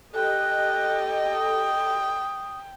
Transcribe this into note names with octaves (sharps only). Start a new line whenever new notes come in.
G4 A4 D#5 G5 F#6
D#6